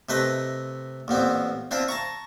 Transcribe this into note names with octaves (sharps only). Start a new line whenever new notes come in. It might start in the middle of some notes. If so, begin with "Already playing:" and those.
C3 A3 B4 D#5 D#6
A1 A#2 B3 C4
C4 D4 E4 F4
A5 A#5 C#6